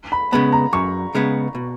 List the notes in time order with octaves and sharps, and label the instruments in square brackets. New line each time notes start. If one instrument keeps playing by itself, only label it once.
[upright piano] B5
[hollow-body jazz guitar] C#3 G#3 B3 [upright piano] B5
[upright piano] A#5
[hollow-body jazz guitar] F#2 [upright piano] C#6
[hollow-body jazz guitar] C#3 G#3 B3
B2